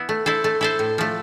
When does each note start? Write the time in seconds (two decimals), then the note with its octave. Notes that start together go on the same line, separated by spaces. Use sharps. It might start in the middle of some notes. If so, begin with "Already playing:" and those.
Already playing: B3 E4
0.09 A3
0.26 E4 A4 C5
0.44 A3
0.61 E4 A4 C5
0.79 A2
0.98 F3 A3